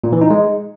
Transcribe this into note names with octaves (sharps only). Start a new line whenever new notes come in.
A#2
E3
D#4
G#3